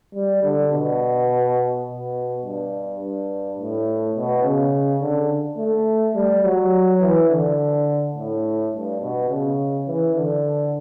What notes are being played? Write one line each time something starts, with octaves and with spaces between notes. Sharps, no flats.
G3
D3
B2
B2
G2
G2
A2
B2
C#3
D3
A3
G3
F#3
E3
D3
A2
G2
B2
C#3
E3
D3